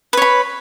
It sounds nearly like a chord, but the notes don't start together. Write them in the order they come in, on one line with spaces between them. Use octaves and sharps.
B4 C#5 B5